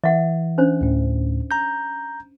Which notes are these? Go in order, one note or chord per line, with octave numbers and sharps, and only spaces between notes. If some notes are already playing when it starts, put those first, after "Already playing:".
E3 E5 F#5
C#4 D4 C5
D2 A2
A#5 G6